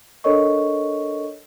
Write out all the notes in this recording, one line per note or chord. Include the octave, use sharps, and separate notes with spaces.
D4 A4 A#4 C#5 D#5 C#6